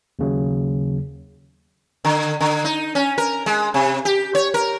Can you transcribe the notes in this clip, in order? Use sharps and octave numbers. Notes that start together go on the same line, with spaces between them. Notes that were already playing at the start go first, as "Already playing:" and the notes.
D#2 C#3 F#3
D3
D3
D#4
C#4
A#4
G#3
C3
G4
C#5
A#4